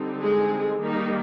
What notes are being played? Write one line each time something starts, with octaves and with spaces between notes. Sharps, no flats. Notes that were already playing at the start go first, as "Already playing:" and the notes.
Already playing: D3 G3 C4 D#4
G#3 G#4
D#3 G3 A#3 D#4